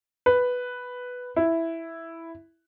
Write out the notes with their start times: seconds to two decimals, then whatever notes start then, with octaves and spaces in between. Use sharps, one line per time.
0.26 B4
1.36 E4